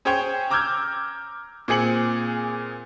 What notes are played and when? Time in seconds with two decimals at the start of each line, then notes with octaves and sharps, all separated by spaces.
0.05 C#4 G#4 C5 C#5 G5
0.50 A#5 D6 E6 F6 G6 G#6
1.68 A#2 C4 G#4 C#7 F#7